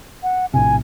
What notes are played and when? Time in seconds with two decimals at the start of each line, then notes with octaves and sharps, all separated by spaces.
0.23 F#5
0.54 A#1 A2 C3 G#5